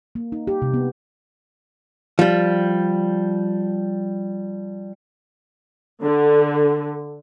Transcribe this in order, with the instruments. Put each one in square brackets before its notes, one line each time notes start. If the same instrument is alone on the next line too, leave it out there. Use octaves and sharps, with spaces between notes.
[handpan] A#3
D#4
G4
C3
B3
[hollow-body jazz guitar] F3 G3
[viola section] D3